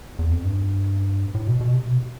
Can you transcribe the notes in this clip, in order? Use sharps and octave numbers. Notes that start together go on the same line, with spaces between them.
E2
F2
G2
A2
B2
B2
C3
B2